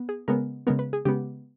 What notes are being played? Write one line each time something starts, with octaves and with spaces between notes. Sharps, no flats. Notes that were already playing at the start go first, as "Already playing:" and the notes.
Already playing: B3
G#4
C#3 G#3 B3 A#4
C#3 G#3 B3 A#4
B4
G#4
C#3 G#3 B3 G4